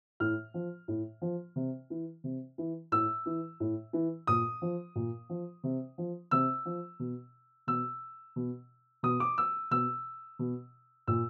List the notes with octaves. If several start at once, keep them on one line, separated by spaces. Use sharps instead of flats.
A2 F6
F3
A2
F3
C3
E3
C3
E3
A2 E6
E3
A2
E3
A#2 D#6
F3
A#2
F3
C3
F3
C3 E6
F3
B2
B2 E6
B2
B2 D#6
D6
E6
B2 E6
B2
A#2 E6